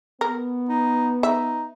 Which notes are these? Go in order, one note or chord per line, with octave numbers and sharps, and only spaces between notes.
B3 A#4
D#4
D#4 E5